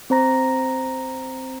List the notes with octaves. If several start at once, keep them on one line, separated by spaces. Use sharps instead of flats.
C4 C5 A#5 A#6